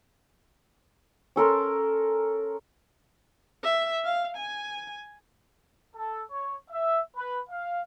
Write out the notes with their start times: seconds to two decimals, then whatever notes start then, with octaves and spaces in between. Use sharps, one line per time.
1.36 C#4 A4 A#4 C6
3.64 E5
4.05 F5
4.36 G#5
5.95 A4
6.30 C#5
6.70 E5
7.16 B4
7.49 F5